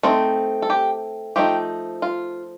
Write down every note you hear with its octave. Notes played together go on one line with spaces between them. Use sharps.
A3 C4 D#4
A4
G4
F3 A3 D#4 G4
F4